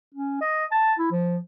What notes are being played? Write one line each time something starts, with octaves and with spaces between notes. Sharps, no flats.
C#4
D#5
A5
E4
F3